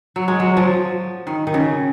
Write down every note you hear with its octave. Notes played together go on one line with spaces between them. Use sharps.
F#3
G#3
F#3
F3
D#3
D#3
C#3